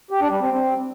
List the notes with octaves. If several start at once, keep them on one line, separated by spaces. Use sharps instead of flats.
G4
D4
G3
C4
C4